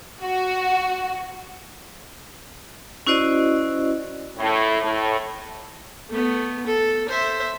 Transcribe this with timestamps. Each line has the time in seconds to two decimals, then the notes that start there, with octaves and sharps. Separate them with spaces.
0.21 F#4
3.07 C#4 E4 F#4 C5 D5 D#5
4.38 A2
4.82 A2
6.10 A3 B3
6.67 A4
7.09 C5 E5